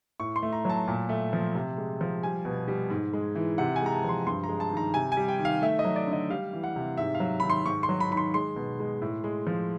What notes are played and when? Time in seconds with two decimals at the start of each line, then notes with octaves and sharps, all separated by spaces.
0.20 A2 C#6
0.36 C6
0.42 A3
0.53 A#5
0.65 F#3 A5
0.88 A#2
1.09 A3
1.33 F3
1.55 C3
1.78 G#3
2.01 F3
2.23 G3 G#5
2.45 B2
2.68 G3
2.90 G#2
3.13 G#3
3.35 E3
3.58 C3 F#5
3.76 G#5
3.82 G#3 A#5
3.92 A5
4.04 F3 C6
4.26 G2 C6
4.44 G#3 A#5
4.60 A5
4.72 D#3 A#5
4.94 C3 G#5
5.12 G#5
5.17 G3
5.28 G5
5.39 D#3
5.45 F5
5.62 A3 E5
5.79 D#5
5.85 F#3
5.96 D5
6.07 D3
6.13 D#5
6.30 G3 F5
6.53 E3
6.64 F#5
6.76 C3
6.97 G#2 E5
7.15 F5
7.20 F#3
7.40 D#3 B5
7.50 C6
7.66 G#2 C#6
7.83 C6
7.89 F#3
8.00 B5
8.11 D#3 B5
8.17 C6
8.34 G#3 C6
8.56 B2
8.80 G#3
9.02 A2
9.24 G#3
9.47 F3